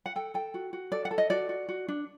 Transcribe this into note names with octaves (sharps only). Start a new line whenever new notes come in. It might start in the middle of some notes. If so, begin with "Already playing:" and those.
F#5
A4 G5
A4 G5
F#4
F#4
A4 D5
F#5
A4
D#5
F#4 D5
F#4
F#4
D4